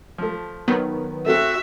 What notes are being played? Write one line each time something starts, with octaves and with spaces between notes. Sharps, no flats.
F3 A3
D#3 F#3 B3
A3 C4 F#4 A4 E5